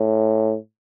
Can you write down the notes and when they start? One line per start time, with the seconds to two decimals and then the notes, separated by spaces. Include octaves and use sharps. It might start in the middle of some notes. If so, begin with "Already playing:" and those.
Already playing: A2